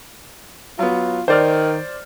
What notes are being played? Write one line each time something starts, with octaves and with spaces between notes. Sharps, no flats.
F#3 B3 F4
D#3 C5 D5 F6